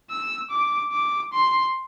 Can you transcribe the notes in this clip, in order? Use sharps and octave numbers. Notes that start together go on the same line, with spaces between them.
E6
D6
D6
C6